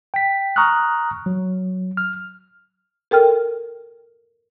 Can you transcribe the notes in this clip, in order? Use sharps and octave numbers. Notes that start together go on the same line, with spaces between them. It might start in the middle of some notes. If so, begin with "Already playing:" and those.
G5 B6
A#5 C#6 D#6 F6 F#6
F#3
F6
A4 A#4 G5 F6